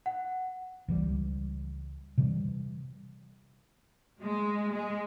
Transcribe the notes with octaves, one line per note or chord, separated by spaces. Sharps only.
F#5
C#2 E3 G3
C3 E3 G3
G#3
G#3